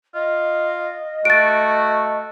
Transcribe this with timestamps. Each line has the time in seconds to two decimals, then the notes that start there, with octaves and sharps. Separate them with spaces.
0.14 F4 D#5
1.25 A3 F#4 A6 D7